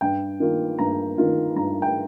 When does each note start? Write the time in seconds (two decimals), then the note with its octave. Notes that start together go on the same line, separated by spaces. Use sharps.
0.01 G2 G5
0.40 D#3 A#3 F4
0.79 G2 A#5
1.18 D#3 A#3 F4
1.56 G2 A#5
1.82 G5